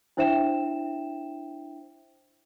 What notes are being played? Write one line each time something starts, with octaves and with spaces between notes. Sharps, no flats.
D4 E4 C5 E5 G5 E7